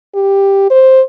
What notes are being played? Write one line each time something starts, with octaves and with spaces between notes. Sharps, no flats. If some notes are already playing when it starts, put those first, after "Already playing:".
G4
C5